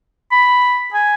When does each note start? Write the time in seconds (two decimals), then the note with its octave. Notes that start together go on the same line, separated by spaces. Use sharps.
0.31 B5
0.93 G#5